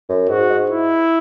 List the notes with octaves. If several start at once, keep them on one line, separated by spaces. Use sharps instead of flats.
F#2
G#2 F#4
G#2
E4